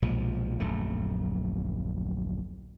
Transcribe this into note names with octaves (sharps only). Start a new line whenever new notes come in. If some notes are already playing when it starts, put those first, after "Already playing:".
B1 A#2 F3 G#3
D1 A#1 F#2 A3